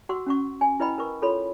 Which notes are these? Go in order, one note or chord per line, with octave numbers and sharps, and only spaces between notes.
F#4 F#5 C6 C#6 E6
C#4 F#5 C#6
G#5
E4 B4 D#5 G5 B5
A#4 B4 C#6
F4 A4 C#5 B5 C6